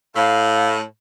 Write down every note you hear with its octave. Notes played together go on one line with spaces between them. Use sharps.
A2 F5